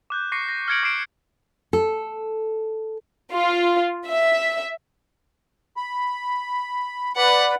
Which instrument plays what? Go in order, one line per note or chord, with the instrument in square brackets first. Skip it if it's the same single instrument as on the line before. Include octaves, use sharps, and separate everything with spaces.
[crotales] D6 F#6 G6
C#6 D6 A#6 C7 C#7
A#6
F6 G6 G#6 C#7 D7 F#7
D6 A#6 C7 D7 E7
[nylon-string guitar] A4
[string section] F4
E5
[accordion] B5
[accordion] B4 D5 B5 [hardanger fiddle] F#5